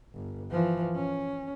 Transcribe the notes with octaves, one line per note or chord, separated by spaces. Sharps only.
G1
E3 F3
C#4